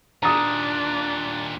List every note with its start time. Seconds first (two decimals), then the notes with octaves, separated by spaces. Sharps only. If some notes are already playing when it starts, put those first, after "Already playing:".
0.23 D#2 A#2 D4 A#5 D#6